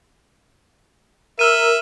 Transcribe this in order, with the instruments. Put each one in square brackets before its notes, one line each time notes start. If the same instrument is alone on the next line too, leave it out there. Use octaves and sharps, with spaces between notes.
[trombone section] A#4 [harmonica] E5 [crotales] E6 F6 D#7